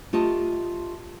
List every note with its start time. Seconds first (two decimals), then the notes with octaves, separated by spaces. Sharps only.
0.13 A3 F4 G4 D#5 A5